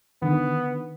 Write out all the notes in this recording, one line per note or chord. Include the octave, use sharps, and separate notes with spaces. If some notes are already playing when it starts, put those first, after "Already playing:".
D3 D#3 B3